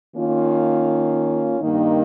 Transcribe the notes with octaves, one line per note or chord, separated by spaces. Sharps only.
D#3 A#3 C#4 F4
G2 D#3 A#3 D#4